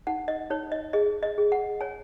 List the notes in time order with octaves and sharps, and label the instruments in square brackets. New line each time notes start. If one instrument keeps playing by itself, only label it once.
[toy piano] D#4 F#5
D#5
D#4 C#5
D#5
G#4 D#5
D#5
G#4
F#5
C#5 G#5